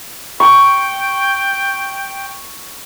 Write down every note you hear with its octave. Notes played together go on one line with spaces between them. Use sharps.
G5 C#6